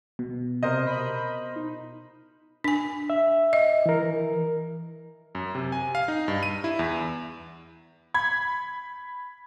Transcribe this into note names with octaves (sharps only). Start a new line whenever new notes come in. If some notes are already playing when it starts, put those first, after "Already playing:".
B2
C3 A#4 C5 D#5
B5
D#4
D4 G#5
E5
D#5
E3 A#4
F#2
C3
G#5
F5
D#4
G2
D#7
E4
E2
B5 G#6